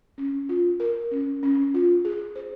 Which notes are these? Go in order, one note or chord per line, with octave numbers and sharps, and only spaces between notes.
C#4
F4
A#4
C#4
C#4
F4
G#4
C5